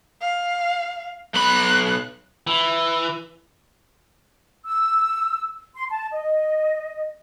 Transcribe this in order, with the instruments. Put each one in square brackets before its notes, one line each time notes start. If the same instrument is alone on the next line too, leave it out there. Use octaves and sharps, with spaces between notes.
[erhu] F5
[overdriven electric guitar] B1 B5 [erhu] F#6
[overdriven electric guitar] E3
[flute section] E6
C6
A5
D#5